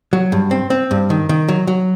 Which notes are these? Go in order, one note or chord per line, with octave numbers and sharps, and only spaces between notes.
F#3
G2
C4
C4
G2
D#3
D#3
F#3
F#3